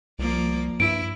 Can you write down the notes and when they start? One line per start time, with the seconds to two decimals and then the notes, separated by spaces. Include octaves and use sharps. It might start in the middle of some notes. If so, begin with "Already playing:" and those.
0.19 C2 F3 A#3 D5
0.80 G2 E4 D7